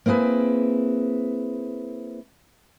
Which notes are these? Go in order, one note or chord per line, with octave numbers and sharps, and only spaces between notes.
A#3 C4 E4 G#4 B4